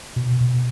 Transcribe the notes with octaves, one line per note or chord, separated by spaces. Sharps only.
B2
B2